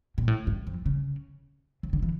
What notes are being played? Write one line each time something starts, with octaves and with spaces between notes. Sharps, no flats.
A#2
A2
G2
F2
C#3
C#3
D3
E3